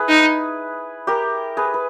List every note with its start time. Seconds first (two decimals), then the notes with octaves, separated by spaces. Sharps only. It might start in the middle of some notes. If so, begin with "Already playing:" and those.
Already playing: E4 G#4 B4
0.09 D#4
1.07 G4 A#4
1.57 G#4 B4
1.74 B4